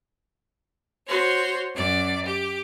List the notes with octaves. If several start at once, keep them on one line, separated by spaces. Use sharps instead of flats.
F#4 C5 C#5
F#2 D5
G4